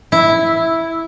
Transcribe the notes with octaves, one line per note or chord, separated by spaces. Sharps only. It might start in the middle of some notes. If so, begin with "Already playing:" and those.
E4